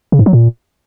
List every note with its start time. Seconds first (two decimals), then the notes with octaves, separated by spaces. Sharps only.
0.12 C#3
0.19 G#2
0.26 F#3
0.33 A#2